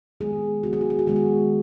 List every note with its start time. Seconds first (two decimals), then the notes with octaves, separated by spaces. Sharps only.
0.20 D#3 G#3 B3 G#4
0.63 D#3 G#3 B3 F#4
0.73 G#4
0.81 F#4
0.90 G#4
0.99 F#4
1.07 D#3 G#3 B3 G#4
1.16 F#4